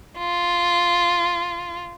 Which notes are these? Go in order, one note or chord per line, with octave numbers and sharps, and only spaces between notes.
F4